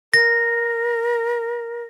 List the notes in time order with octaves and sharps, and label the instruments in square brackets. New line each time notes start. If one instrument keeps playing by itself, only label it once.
[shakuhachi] A#4 [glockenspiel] A#6